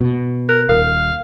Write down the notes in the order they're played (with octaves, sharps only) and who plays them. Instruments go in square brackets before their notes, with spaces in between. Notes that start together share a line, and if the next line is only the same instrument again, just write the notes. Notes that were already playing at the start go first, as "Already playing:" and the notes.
[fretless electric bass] B2
[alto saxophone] A#4 [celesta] F#6
[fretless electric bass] D#1 [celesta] A#4 [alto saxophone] F5